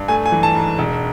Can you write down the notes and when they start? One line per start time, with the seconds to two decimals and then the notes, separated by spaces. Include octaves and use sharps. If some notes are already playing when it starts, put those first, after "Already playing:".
Already playing: G2
0.08 A3 G#5
0.26 G#5
0.32 E3
0.43 A5
0.55 G#2
0.79 E1